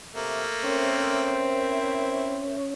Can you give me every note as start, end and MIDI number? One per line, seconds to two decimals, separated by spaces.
0.15 0.46 48
0.15 1.47 57
0.15 1.47 58
0.64 2.46 60
0.64 2.74 61
0.64 2.56 70
0.64 2.56 72
0.64 2.74 73
0.64 2.56 76
1.56 2.36 64